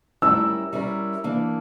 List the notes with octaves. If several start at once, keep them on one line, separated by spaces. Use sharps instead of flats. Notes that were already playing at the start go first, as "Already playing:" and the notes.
G3 C#4 E4 A#4 E6
G3 C#4 E4 A#4
E3 A#3 D4